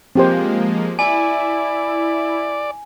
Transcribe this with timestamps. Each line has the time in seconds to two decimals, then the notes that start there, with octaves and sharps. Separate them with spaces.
0.16 F3 G#3 A#3 C4 G4 C5
0.99 E4 D5 G#5